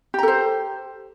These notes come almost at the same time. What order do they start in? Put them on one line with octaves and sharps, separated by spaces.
G4 A#5 A4 C5